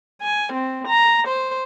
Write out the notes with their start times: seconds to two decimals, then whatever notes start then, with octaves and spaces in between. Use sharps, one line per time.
0.22 G#5
0.53 C4
0.87 A#5
1.27 C5